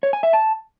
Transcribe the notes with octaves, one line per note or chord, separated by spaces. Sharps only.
C#5
G#5
E5
A5